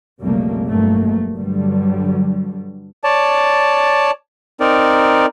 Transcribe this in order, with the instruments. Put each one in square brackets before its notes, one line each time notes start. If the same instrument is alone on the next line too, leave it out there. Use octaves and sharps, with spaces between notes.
[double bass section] B1 F2 C#3 G3 A3 A#3
G1 G2 F#3 A3 A#3
G2 D3 F#3 G3
[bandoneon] C#5 D5 A5
C4 D#4 A#4 D5